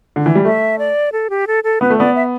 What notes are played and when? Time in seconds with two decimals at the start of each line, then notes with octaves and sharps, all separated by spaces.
0.16 D3
0.26 E3
0.35 G3
0.45 A3 E5
0.79 D5
1.13 A4
1.30 G4
1.47 A4
1.64 A4
1.81 B3 B4
1.90 A3
1.98 B3 D5
2.15 E5